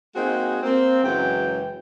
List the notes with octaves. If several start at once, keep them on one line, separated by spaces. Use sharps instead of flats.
G#3 A#3 C4 D#4 F#4 G#4
A#3 C4
F#2 C#3 E3 F#3 G#3 G5